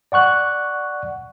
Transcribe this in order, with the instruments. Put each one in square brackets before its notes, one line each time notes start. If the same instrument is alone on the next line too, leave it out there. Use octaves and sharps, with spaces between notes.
[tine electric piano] D5 F#5 C#6 F#6